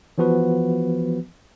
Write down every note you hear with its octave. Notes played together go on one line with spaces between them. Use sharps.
E3 F3 B3 F#4 B4